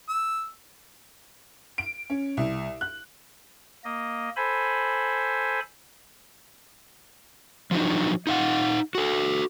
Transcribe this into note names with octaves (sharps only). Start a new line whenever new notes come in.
E6
D7
C#4
C2
F#6
A#3 D#5
A4 C5 G#5 B5
F3 F#3 D4 D#4
D#4 F5 F#5
F#4 A4